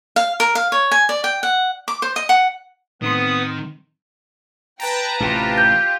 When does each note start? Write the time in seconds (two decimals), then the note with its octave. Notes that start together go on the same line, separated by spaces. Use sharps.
0.16 F5
0.40 A#4
0.55 F5
0.72 C#5
0.91 G#5
1.09 D5
1.24 G5
1.43 F#5
1.88 D6
2.02 C5
2.16 D#5
2.29 F#5
3.02 A2 D#3 B3 C4 B4 C6 D#6
4.80 B4 G5 A5 A#5
5.20 A1 C3 F4 G4
5.58 G6